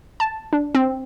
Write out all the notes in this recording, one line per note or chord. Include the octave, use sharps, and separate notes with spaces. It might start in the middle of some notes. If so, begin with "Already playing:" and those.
A5
D4
C4